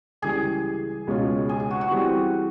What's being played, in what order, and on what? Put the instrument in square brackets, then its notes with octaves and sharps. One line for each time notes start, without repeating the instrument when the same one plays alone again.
[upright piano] C#2 C#3 E3 G3 [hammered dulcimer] G#4
[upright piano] C#2 B2 G#3 C#4 F4
[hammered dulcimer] G#4
G#4
F#4
F#4
[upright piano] E3 G3 C4